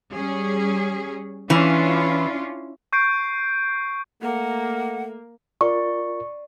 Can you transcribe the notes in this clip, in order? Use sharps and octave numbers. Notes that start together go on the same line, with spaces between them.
G3 C#4 G#4
E3 C#4 D4 F4
C#6 G6 C7 D7
A3 A#3 F#5
F4 A#4 D5 C#6